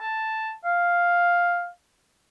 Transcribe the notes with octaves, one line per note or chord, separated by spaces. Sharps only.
A5
F5